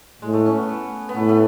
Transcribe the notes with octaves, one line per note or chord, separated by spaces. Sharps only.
A2 G#3
A3
C#4
B3
A3
B3
A2 A3
A3